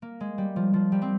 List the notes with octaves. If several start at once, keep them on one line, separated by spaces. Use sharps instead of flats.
A#3
G#3
G3
F3
F3
G3
C4